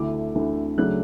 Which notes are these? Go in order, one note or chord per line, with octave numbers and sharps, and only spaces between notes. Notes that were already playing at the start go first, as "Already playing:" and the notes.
Already playing: D2 D3 A3 E4 D6
D2 D3 A3 E4
C#3 F#3 A3 D4 F#6